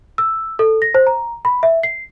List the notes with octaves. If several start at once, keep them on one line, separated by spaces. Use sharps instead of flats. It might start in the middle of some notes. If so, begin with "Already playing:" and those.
E6
A4
A#6
C5
A#5
B5
E5
C7